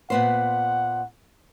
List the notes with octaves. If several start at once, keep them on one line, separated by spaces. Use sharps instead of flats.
A#2 B3 C5 F#5